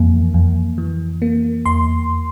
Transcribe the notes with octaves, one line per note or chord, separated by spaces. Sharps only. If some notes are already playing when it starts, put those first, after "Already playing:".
Already playing: F2 E3 A#3
F2
E3
A#3
E2 C6